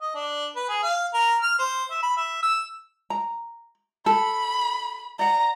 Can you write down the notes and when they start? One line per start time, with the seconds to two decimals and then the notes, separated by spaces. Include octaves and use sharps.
0.01 D#5
0.15 D4
0.56 B4
0.69 G#4
0.83 F5
1.14 A#4
1.42 F6
1.59 C5
1.91 E5
2.03 B5
2.17 E5
2.43 E6
3.10 A#5
4.06 A4 B5
5.19 D5 F#5 A#5